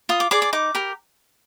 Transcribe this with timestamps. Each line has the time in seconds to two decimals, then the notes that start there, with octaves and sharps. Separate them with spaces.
0.09 F4 D#6
0.20 D6
0.31 G#4 D5 D6
0.42 D6
0.53 D#4 D6
0.75 G4 A#4